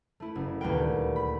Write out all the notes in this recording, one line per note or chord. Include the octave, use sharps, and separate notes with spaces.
A3 E4
F#1
D#1 D2 G3 A#3 B4 G5
B5